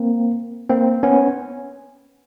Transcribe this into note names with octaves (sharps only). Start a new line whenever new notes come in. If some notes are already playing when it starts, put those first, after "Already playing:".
Already playing: A#3 C4
A#3 C4
B3 C#4